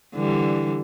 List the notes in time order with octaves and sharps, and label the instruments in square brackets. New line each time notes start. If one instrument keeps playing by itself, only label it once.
[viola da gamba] D3 E3 G3